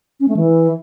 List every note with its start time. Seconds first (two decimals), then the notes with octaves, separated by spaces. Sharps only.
0.20 C#4
0.28 A3
0.37 E3